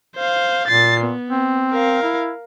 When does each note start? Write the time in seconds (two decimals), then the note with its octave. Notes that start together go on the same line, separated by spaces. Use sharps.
0.16 C5 F5
0.68 A#2 A6 C7
1.01 B3
1.30 C4
1.72 A#4 F5
2.03 E4